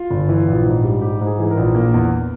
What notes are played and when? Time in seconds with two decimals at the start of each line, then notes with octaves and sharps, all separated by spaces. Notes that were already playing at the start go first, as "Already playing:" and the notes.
Already playing: F4
0.11 G1
0.29 E3
0.48 A#1
0.65 G#2
0.84 G3
1.01 G#2 G4
1.21 G#2 G#4
1.39 E3 G#4
1.51 A#4
1.57 A#1
1.75 A#3
1.94 E2